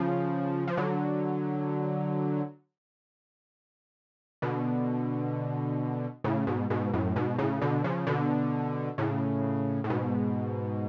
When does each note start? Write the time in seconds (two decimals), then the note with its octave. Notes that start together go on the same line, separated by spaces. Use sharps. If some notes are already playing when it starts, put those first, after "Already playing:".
Already playing: C#3 F3
0.68 F3
0.77 D3 F#3
4.42 B2 D3
6.24 A2 C#3
6.47 G#2 B2
6.70 G#2 B2
6.93 F#2 A2
7.16 G#2 B2
7.38 A2 C#3
7.61 B2 D3
7.84 C#3 F3
8.07 B2 D3
8.98 A2 C#3
9.84 A2
9.90 G#2 B2